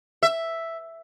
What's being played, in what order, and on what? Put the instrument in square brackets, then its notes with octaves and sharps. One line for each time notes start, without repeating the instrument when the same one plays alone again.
[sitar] E5